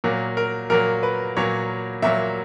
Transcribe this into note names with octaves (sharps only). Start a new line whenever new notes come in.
A#2 F#3 A#3
A#4
A#2 F#3 A#3 A#4
B4
A#2 F#3 A#3 C#5
A#2 F#3 A#3 E5